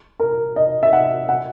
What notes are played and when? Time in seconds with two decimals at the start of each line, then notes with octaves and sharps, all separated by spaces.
0.20 A#4
0.56 D#5
0.83 E5
0.93 F#5
1.29 F#5